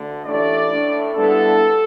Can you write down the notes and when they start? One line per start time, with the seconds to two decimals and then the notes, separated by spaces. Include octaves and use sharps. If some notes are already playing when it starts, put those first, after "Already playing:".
Already playing: D2 D3
0.25 A1 A2 A3 D4 D5
0.70 A2 A3 D4
1.15 G2 D3 B3 E4 A4